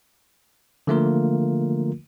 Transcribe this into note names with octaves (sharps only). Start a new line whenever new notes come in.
D3 F3 A3 A#3 F4 A#4